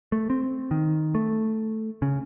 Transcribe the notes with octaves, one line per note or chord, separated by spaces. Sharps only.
A3
C4
D#3
A3
C#3